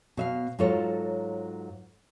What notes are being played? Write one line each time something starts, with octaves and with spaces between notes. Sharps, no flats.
B2 E5 F5
G#2 F#3 F4 A4 C#5